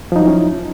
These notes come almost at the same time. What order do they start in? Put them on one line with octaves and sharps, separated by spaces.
F3 D#4 F#3 E4 C#4